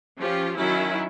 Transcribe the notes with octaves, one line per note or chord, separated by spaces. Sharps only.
F3 C#4 F4 G4
D#3 F#3 C#4 E4